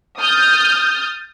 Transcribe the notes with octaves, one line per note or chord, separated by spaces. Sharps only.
D#6 F6 G6 A6